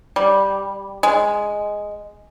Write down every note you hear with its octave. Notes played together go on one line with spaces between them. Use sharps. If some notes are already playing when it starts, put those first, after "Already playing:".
G3
G#3